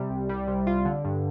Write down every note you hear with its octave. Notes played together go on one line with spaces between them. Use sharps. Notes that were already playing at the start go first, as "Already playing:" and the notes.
Already playing: C3 G3
C2
G3
C3
F4
D3
G2